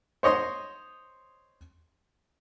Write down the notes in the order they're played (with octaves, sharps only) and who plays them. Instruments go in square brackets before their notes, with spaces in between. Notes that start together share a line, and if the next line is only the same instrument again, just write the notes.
[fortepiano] C5 C#5 D#5 C6